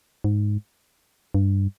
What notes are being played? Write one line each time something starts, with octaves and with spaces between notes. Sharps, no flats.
G#2
G2